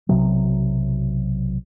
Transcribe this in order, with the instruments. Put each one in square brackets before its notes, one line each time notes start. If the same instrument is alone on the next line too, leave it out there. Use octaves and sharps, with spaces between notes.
[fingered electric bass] B1 C3 F#3